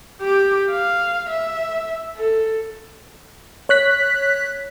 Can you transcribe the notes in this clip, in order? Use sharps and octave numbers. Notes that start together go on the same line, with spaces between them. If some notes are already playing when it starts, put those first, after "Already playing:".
G4 D6
F5
E5
A4
C#5 F#6 B6